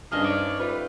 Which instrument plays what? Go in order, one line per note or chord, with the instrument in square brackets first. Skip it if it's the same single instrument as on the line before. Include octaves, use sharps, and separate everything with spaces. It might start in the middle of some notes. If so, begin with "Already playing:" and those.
[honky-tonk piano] G2 F6 [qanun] C#4 D#4 C5 [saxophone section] G#4 D#5
[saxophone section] C#5 D5
[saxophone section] G3 A3 F4 [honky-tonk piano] B4